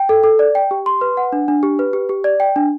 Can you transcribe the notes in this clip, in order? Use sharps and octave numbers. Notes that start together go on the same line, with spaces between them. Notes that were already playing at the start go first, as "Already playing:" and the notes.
Already playing: G5
A4
A4
D5
G5
G4
C6
B4
F#5
D4
D4
G4
B4
G4
G4
D5
G5
D4